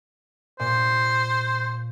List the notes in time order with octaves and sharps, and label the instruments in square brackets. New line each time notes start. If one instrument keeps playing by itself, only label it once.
[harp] A#2 [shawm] C5